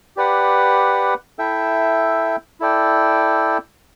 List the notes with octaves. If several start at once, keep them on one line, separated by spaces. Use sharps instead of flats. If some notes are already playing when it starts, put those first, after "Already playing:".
G4 B4 D5 F#5
E4 A4 E5 G5
E4 A4 D5 G5